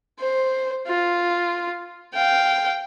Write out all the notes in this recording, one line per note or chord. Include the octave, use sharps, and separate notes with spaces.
C5
F4
F5 G5